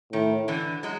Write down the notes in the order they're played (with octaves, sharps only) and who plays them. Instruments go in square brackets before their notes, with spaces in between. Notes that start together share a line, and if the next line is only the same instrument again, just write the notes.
[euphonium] A2 [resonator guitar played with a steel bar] D#3
[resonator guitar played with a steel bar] D3 E3
F#3 G#3